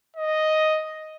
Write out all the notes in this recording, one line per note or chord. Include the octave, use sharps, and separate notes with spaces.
D#5